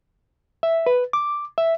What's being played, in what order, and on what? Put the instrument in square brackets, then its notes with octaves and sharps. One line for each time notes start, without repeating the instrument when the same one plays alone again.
[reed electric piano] E5
B4
D6
E5